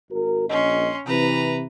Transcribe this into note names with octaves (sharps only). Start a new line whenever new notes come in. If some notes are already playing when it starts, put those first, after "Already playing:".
G#1 F#4 A#4
A#1 C#4 D#5 C6
C3 E3 B4 A#5